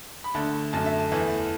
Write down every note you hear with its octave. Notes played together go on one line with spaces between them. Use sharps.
B5
D2 D3 A3 A5
F#2 D3 A3 A5
E5
A5
E2 E3 A3